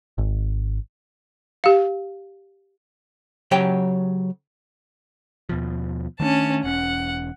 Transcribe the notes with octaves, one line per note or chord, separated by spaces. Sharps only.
G#1
G4 F5
C#3 F#3 G4 C#5 G5
D#2 B2 F3
D#3 A3 C#4 D4 A5
E1 C#4 F#5